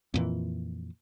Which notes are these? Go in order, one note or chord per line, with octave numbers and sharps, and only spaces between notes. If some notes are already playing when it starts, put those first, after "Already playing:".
F2 A#2 E3